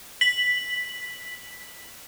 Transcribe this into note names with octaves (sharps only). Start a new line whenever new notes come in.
B6 F#7